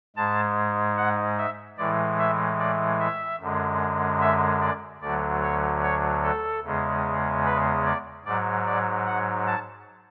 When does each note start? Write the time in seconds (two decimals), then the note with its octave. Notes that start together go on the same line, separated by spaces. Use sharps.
0.17 G#2 G#3 A5
0.97 F#5
1.38 E5
1.78 A2 E3 G#3 D5
2.19 E5
2.59 D5
3.00 E5
3.41 F#2 D3 G#3
4.21 E5
4.61 D5
5.01 D2 D3 F#3 D5
5.42 C#5
5.83 C#5
6.24 A4
6.64 E2 C#3 G#3
7.45 B4
7.86 D5
8.25 G#2 F#3 D5
8.66 D5
9.06 F#5
9.47 A5